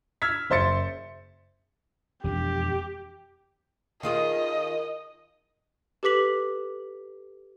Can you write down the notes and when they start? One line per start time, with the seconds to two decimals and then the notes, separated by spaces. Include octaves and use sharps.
0.22 E6 F6 G#6 B6
0.50 F#1 C5 E5 C6 A6 C#7
2.24 E1 F2 D4 G4
4.03 D#3 F4 G#4 D#5
6.03 G4 A4 B4 D6 B6 F#7